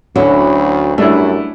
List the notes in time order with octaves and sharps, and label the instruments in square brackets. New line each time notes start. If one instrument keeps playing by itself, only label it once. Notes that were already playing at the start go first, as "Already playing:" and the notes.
[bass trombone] D2 [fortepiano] D3 [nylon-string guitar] F#3 C#4 E4
[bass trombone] F#2 [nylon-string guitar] G3 [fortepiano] A3 D4 E4